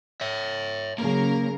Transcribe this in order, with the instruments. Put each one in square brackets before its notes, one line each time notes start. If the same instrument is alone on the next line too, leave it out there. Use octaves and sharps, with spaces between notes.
[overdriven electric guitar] C#5 E5
[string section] C#3 F#3 A#4 [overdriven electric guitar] A#3